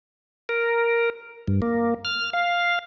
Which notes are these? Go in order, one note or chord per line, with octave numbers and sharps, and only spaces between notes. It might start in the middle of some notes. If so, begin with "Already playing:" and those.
A#4
G2
A#3
F6
F5